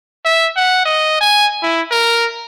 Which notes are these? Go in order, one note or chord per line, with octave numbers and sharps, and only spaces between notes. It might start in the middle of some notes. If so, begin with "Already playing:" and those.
E5
F#5
D#5
G#5
E4
A#4